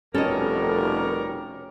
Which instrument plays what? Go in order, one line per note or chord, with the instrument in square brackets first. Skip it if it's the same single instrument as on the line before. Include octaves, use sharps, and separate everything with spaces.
[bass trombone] F1 [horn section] B2 G3 A#4 [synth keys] C#4 [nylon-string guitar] A4 D#5